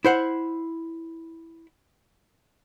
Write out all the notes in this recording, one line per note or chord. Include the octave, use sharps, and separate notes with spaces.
E4 C5 F#5